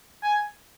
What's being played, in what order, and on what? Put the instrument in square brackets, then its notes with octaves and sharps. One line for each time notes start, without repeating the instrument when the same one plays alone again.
[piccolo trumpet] G#5